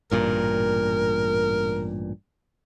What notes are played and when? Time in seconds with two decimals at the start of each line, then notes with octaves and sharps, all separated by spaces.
0.11 A1 G2 A#2 A#4